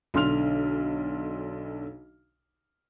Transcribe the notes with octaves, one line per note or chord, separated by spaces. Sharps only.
B1 D3 C6 F6 F7